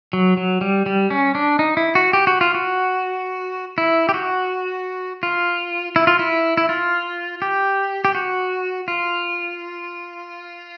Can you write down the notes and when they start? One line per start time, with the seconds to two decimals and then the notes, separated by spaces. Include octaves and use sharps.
0.13 F#3
0.37 F#3
0.61 G3
0.86 G3
1.10 C#4
1.35 D4
1.59 D#4
1.77 E4
1.95 F#4
2.13 G4
2.27 F#4
2.41 F4
2.54 F#4
3.78 E4
4.09 G4
4.14 F#4
5.23 F4
5.96 E4
6.07 F4
6.19 E4
6.57 E4
6.69 F4
7.42 G4
8.05 G4
8.15 F#4
8.88 F4